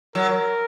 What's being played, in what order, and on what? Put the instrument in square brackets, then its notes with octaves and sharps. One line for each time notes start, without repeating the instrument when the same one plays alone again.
[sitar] F#3 [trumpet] A#4